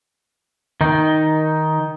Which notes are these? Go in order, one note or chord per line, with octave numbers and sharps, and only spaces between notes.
D#3 D#4